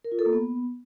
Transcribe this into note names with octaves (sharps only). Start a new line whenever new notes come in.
A#4
F4
A4
A#3
B3